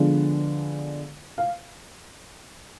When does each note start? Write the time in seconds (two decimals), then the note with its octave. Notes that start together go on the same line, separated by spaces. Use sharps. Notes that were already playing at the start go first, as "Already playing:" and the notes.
Already playing: D3 F3 G#3 B3 D4
1.38 F5